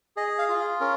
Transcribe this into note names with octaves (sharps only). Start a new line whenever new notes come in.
G#4 D#5
F5
F4
G#4
C#4 A#4